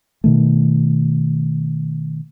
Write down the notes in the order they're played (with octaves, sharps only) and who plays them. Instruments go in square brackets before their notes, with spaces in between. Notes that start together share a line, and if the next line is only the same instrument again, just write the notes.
[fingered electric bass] B2 D#3 A3